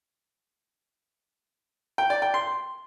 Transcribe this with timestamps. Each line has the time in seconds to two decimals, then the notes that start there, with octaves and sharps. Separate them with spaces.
1.98 G5
2.10 D5
2.22 G5
2.34 C6